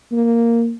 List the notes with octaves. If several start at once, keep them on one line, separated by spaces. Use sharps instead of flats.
A#3